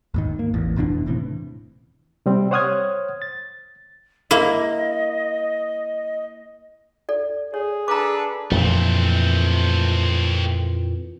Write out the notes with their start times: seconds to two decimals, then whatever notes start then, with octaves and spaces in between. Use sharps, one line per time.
0.14 D#2 G#2 D#3
0.39 A#3
0.54 A1 E2
0.76 F1 B2 E3 D4
1.06 D#2 A2 C3 E3
2.26 C3 G3 C4
2.51 C5 C#5 F#5 D#6 F6 G#6
3.22 A6
4.31 A#3 E4 D#5
7.09 A4 D5
7.54 G#4 C#5
7.88 D4 A4 B4 A#5 D6
8.51 F2 A#2 E3 A3 C4